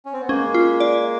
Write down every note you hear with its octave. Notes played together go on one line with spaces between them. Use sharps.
C#4
C4
B3
G#3 A#3 C#4
F4
D5